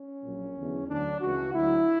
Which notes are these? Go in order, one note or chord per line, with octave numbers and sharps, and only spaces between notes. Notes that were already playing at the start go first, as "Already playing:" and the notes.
Already playing: C#4
A#1 A#2 F#3
E2 D3 F#3
D2 D3 F#3 D4
C#2 C#3 E3 F#4
D2 D3 F#3 E4